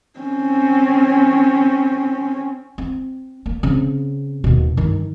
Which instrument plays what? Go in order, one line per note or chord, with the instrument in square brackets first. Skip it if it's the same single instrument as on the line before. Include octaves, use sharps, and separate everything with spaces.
[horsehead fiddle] C4 C#4
[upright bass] C4
A#3
C#3 C4
D#2 B2
G2 D#3